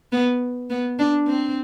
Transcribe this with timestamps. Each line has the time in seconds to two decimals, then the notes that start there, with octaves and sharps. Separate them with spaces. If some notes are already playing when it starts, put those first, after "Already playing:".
0.12 B3
0.70 B3
0.99 D4
1.27 C4